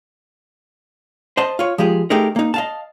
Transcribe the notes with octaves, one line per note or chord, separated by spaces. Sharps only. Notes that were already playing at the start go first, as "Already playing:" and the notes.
C5 D#5 A5
F4 C#5
F3 G#3 G4 G#4
A3 D#4 G4 G#4 A#4
A#3 D#4
D#5 F5 A5